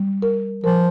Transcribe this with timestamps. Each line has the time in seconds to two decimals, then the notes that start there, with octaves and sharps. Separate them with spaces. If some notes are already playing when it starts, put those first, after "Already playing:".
Already playing: G3
0.22 A#4
0.64 F3 A#4